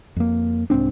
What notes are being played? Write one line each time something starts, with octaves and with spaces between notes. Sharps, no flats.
F2 A#3
C2 G#2 C4 D4